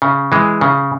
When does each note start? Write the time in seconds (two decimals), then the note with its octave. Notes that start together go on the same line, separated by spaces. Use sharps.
0.02 C#3
0.32 E3 G#3
0.61 C#3